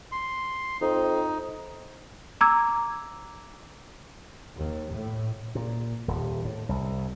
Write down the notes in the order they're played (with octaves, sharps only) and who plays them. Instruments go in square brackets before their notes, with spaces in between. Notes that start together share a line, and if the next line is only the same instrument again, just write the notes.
[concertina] C6
[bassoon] F2 [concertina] D#4
[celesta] A#5 D6 E6 G#6
[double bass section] D#2
A2
[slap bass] A#2
D#1
A2
C2